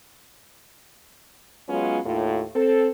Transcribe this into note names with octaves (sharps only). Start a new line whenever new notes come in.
F#3 G#3 B3 C#4 F4
D#2 A2 F4
C4 A4